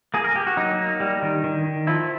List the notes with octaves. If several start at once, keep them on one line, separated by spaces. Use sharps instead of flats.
A#3 G#4
A#4
A#3 G4
F#4
F#3 D#4
A#3
G3
D#3
D#3
D#3
F3 E4